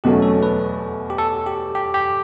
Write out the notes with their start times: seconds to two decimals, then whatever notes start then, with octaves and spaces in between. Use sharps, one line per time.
0.04 E2 B2 F#3 A3 C#4 G4
0.22 A4
0.43 B4
1.10 G4
1.18 A4
1.46 G4
1.75 G4
1.94 G4